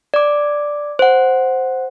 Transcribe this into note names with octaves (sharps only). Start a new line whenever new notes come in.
D5 D6
C5 F#5